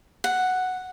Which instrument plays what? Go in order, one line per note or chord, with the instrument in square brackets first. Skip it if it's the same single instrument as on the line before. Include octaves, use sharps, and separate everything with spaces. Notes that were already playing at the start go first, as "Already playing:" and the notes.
[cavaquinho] F#5